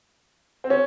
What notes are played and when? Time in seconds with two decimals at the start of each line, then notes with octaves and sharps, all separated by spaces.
0.64 C4
0.70 C#4